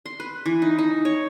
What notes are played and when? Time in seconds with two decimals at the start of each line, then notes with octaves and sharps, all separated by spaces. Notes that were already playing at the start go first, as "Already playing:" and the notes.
0.06 C6
0.20 B4
0.46 E3
0.62 D#4
0.79 D#4
1.05 C#5